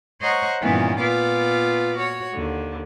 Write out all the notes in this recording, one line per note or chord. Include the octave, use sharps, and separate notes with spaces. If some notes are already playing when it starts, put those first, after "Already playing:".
C5 C#5 D#5 F#5 A#5 C#6
G2 A#2 D#3 E3 B3 C#4
A#2 B3 F4 B4 D6 F6
F#4 C#5
D#2 D3